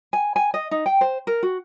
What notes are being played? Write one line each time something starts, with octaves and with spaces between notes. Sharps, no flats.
G#5
G#5
D#5
D#4
G5
C5
A#4
F#4